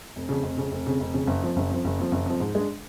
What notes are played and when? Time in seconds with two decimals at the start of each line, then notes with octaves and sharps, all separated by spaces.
0.16 F1
0.29 F2 C#3
0.43 F1
0.57 F2 C#3
0.72 F1
0.86 F2 C#3
1.00 F1
1.14 F2 C#3
1.27 F#1
1.42 F2 F3
1.57 F#1
1.70 F2 F3
1.85 F#1
1.98 F2 F3
2.12 F#1
2.26 F2 F3
2.40 G#2
2.55 G#3 D4